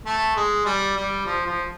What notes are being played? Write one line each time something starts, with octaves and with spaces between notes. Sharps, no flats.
A3
G#3
G3
G3
F3
F3